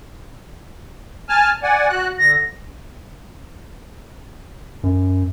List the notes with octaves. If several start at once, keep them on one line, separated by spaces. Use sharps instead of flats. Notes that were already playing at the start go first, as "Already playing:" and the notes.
G#5 A5 F6
D5 F#5 G#5
F#4 F#6
D3 A#6
F#2